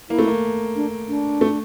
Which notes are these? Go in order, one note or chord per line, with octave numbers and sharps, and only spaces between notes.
A#3 E4
A3
A#3
D4
D4
A3